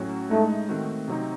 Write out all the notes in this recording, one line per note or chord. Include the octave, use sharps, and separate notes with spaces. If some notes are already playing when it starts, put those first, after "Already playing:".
Already playing: A2 F#3 C#4 F#4
A2 G#3 A3 D#4
D#3 A3 C4 F#4
C3 F#3 C4 D#4